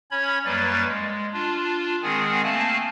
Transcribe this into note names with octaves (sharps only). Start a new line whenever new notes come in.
C#4 C#5 B5 G#6
F#2 F#3 G3 A#3 B4 A6
G#3
D4 F4
D#3 G#3 C4 G#4 F#5 G#5
A3 A#3 C4 F5 G#5 A5